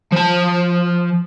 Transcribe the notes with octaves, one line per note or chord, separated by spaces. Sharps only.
F3 A5